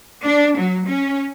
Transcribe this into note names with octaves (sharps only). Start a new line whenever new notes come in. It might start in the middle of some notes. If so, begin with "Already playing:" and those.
D4
F#3
C#4